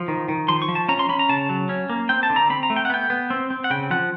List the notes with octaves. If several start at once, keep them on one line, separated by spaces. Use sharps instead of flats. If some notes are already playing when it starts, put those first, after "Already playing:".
Already playing: F3
D#3
D#3
F3 C6
C#6
F3
A5
C#4 A#5
C6
C#4 B5
A#5
C#3 A5
F#3
C#4
A#3
C4 G5
A5
D3
A#5
C4 B5
A#5
A3
G5
F#5
B3 G5
B3
C4
C4
F#5
C#3 G5
F3 F#5